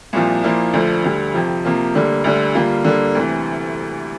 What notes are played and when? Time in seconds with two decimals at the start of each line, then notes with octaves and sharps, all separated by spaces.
0.13 C2 A#2 F3
0.44 A#2 F3 A#3 E4
0.73 D2 D3 F3
1.04 D2 D3 G3
1.34 F2 C3 F3
1.65 C3 F3 A#3
1.95 D2 D3 G3 A#3
2.24 D2 D3 G3
2.55 D3 G3 A#3 F4
2.84 D3 G3 A#3
3.15 D2 C3 E3